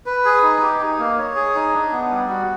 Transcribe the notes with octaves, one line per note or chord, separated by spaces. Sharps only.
B4
G#4
D#4
G4
D#4
A#3
C#5
G#4
D#4
D4
B3
G3
F#4